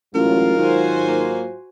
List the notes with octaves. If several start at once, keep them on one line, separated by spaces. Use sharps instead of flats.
A1 G#2 F#3 F4 A#4
D#3 F#4 C5 G#5
A#3